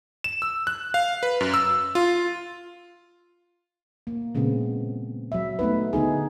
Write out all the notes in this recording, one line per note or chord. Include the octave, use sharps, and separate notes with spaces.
E7
E6
F#6
F5
B4
F#2
E6
F4
A#3
A#2 C#3 G#3 B3 C4
F#3 E5
A3 B3 D#4 B4
D3 B3 D#4 G#4